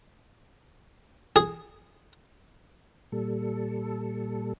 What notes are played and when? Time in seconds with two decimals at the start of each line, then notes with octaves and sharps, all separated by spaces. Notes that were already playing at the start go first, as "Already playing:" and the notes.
1.36 G#4
3.12 A#2 G3 A4